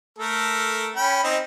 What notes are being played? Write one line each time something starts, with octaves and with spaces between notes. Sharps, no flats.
A3 A4 A#4
C#4 G5 B5
C4 D#4